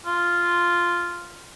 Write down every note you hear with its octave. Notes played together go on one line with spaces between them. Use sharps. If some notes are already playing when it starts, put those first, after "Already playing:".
F4